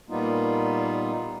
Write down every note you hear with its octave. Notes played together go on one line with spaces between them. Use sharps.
A#2 G3 A#3 B3 D#4 F4